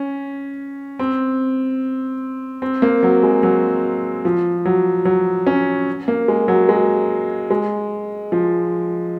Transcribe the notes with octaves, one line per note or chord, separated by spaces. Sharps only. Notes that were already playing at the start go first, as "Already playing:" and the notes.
Already playing: C#4
C4
C4
A#3
F#3
G#3
F#3
F3
F#3
F#3
C#4
A#3
G#3
F#3
G#3
G#3
F3